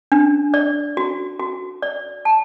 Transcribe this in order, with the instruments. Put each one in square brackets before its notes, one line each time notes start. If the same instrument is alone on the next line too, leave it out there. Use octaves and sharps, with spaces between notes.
[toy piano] D4
D5
F#4
F#4
D5
A5